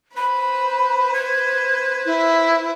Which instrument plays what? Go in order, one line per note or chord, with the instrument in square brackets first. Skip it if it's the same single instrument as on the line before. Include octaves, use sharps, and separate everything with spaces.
[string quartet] B4 C5 [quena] B5
[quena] G#6
[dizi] E4